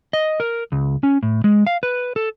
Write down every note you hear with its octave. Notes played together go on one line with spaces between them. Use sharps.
D#5
A#4
C#2
C#4
A2
G#3
F5
B4
A4